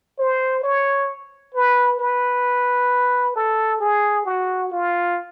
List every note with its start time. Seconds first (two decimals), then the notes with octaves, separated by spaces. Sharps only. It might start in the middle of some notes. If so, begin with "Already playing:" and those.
0.19 C5
0.64 C#5
1.55 B4
1.99 B4
3.36 A4
3.81 G#4
4.25 F#4
4.72 F4